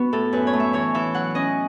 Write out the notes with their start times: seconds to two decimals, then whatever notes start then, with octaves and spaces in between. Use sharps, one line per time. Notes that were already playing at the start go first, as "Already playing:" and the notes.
Already playing: B3 F#4 B4
0.13 A2 A4
0.33 F#2 B4
0.47 C#5
0.53 A3
0.60 E5
0.73 E3 C#5
0.94 E3 E5
1.14 F#3 F#5
1.35 C#4 D#5